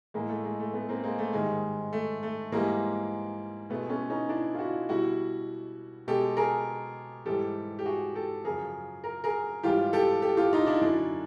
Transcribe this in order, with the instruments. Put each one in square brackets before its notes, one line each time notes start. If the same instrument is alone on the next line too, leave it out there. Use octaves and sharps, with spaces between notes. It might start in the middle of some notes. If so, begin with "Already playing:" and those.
[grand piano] A2 E3 G#3 A#3
A3
G#3
A3
A3 B3
A#3 C4
G#3 A#3
A3
G#2 D#3 G3 G#3
A3
A3
G#2 E3 G3 G#3 A#3
B2 G#3 A3 B3
B3 C#4
C#4 D#4
D4 E4
F4
E4 F#4
B2 G3 E4 F#4
B2 G#3 G4 A4
G#4 A#4
G#2 E3 G3 G4 A4
G4
F#4 G#4
G4 A4
F#2 C#3 F3 G#4 A#4
A#4
G#4 A#4
G#2 E3 G3 F4 G4
G4 A4
G4 A4
F4 G4
D#4 F4
D4 E4
F#2 D3 F#3 D4 E4